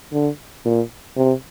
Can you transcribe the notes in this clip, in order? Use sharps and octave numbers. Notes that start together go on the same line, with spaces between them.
D3
A#2
C3